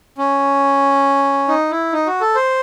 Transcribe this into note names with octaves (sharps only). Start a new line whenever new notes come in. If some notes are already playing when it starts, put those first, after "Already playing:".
C#4
D#4
E4
D#4
F#4
A4
C5